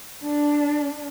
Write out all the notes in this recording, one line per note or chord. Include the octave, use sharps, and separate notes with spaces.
D4